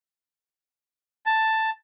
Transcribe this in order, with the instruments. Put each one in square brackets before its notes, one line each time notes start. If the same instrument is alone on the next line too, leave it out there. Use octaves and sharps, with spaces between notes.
[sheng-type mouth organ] A5